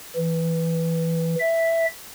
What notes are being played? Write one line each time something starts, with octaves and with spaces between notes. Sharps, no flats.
E3
E5